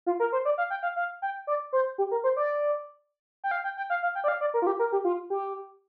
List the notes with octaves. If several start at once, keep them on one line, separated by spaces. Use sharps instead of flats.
F4
A#4
C5
D5
F5
G5
F5
F5
G5
D5
C5
G4
A#4
C5
D5
G5
F5
G5
G5
F5
F5
G5
D5
F5
D5
A#4
F4
G4
A#4
G4
F4
G4